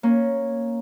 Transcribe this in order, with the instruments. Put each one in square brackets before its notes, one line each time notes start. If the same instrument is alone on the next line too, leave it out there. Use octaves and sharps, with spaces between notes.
[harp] A#3 C#4